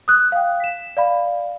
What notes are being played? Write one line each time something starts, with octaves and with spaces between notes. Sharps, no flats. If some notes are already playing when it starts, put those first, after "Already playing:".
D#6 F#6
F5 G5
B6 E7
D5 F5 B5